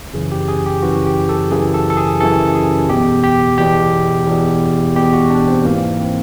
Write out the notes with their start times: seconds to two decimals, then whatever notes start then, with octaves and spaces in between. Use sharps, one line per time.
0.14 F#2 C#3 E3 G#4
0.32 G4
0.48 G#4
0.66 G4
0.82 F#2 C#3 E3 F#4
1.06 G4
1.29 A4
1.51 F#2 C#3 E3 G#4
1.74 A4
1.90 A4
1.97 G#4
2.20 F#2 C#3 E3 A4
2.55 G#4
2.89 E2 B2 G4
3.23 G4
3.58 E2 B2 G4
4.27 E2 B2
4.96 E2 B2 G4
5.13 F#4
5.31 D4
5.48 C4
5.65 G#2 E3 A#3
6.00 C4